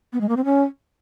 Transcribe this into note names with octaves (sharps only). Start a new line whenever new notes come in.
B3
G#3
A#3
C4
C#4